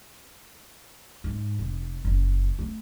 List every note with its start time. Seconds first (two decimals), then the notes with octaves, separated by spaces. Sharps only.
1.24 G#2
1.59 F1
2.05 F#1
2.59 A3